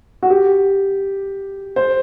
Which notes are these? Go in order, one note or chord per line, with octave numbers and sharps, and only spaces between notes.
F#4
G4
C5